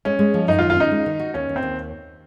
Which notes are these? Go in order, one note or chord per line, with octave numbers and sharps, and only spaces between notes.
G#3 C#4
G#3
F3
F#2 D#4
F4
D#3
F4
C#4 D#4
G#3
D#3
F#4
D#2 C#4
D#2
C4
D#2